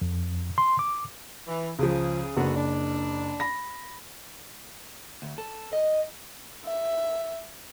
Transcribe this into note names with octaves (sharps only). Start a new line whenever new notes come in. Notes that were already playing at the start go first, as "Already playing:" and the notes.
F2
C6
D6
E3
C#2 C#3 F3 G#4
F#1 D3 B3 F#4
D4
B5 A#6
D2
A4
D#5
E5